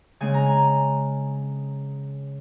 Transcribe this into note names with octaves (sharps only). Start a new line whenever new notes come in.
C#3 G#3 C4 G#5
A#5
G#5